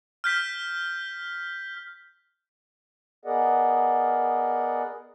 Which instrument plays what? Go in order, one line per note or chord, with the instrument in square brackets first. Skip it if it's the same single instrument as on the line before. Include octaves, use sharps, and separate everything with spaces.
[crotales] F6 G6 B6
[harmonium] B3 G#4 A#4 D5 D#5 F#5